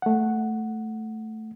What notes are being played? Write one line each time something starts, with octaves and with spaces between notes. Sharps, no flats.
A3 F#5